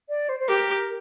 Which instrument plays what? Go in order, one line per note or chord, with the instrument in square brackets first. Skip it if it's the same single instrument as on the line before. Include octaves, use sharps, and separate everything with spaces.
[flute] D5
C5
C5
[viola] G4 [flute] A#4